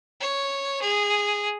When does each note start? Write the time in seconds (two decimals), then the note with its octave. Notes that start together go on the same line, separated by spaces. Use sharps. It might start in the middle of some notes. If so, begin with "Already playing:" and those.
0.21 C#5
0.82 G#4